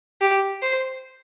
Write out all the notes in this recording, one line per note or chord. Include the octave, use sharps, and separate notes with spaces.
G4
C5